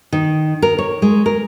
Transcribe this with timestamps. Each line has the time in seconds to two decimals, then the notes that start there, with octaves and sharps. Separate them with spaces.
0.13 D#3
0.62 A#4
0.79 C#5
1.02 G#3
1.26 A#4